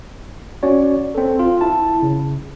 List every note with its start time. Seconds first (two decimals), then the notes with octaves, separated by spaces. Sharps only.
0.63 C#4 F#4 C#5 D5
1.15 C4 A4
1.39 F4
1.61 E4 A5
2.02 C#3